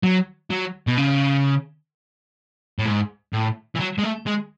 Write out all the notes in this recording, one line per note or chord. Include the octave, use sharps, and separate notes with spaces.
F#3
F#3
B2
C#3
A2
G#2
A2
E3
F#3
G#3
A3
G#3